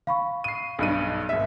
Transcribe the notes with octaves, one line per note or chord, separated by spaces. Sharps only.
F5 B5 C#6
C7 D#7
B1 G2 D#7
G#1 E5